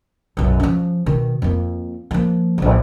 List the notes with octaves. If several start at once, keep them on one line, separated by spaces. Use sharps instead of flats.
B1 F#2
F3 C#4
B2 D#3
F2 A#3
F3 A#3
E1 A#1